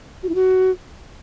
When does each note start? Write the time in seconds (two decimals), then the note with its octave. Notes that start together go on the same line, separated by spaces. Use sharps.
0.23 F#4
0.29 E4
0.35 F#4